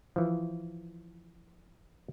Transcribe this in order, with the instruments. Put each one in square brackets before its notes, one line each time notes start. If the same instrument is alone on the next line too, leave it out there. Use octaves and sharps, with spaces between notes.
[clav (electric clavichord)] E3 F3